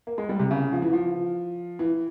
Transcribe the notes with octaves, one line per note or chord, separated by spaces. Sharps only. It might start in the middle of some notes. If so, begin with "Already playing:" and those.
A#3
G#3
G3
C3
C#3
F3
E3
F3
E3